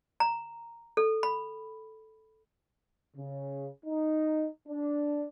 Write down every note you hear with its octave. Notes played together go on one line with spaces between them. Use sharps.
A#5
A4
B5
C#3
D#4
D4